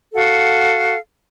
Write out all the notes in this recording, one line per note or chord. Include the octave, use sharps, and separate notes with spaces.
F#4 A4 F5 F#5